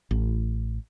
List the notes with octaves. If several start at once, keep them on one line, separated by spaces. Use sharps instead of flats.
A1